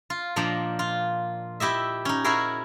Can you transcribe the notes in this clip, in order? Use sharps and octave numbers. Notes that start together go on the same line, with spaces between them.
F4
A#2 F3 D4 D#5 A#5
F4
E4 G4 D#5 E5
C#4 D#4
C#4 E4 F#4 G#4 A#4